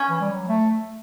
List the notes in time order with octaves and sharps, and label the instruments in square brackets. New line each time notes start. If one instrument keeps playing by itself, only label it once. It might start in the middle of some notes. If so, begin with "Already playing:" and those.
Already playing: [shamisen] C#4
[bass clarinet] E3
G3
F#3
A3